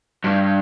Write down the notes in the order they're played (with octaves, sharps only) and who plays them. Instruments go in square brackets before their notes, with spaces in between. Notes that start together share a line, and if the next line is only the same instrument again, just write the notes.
[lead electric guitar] G2